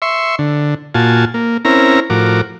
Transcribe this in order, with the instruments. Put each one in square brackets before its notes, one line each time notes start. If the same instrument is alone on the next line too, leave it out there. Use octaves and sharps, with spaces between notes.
[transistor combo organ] E5 C6 C#6
D3
A#2 F4 F#4 G#5 A5
A#3
C4 C#4 E4 A#4 A#5
A2 F3 F#4 A#4 D6